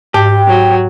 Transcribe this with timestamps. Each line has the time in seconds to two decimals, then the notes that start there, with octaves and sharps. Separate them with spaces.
0.14 G#2 G4 G5
0.48 F#3